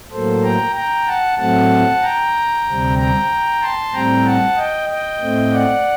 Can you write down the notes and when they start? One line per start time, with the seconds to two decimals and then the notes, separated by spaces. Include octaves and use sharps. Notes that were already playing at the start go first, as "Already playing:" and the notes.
0.12 A2 F#3 A#3 A4 C5
0.44 G5 A#5
0.76 G5 A#5
1.07 F#5 A5
1.39 A2 F#3 A3 C4 F#5 A5
2.03 G5 A#5
2.67 D2 C3 G3 C4
2.98 G5 A#5
3.62 A5 C6
3.94 A2 G3 C4 G5 A#5
4.26 F#5 A5
4.57 D#5 G5
4.89 D#5 G5
5.21 A2 A3 C4
5.52 D5 F#5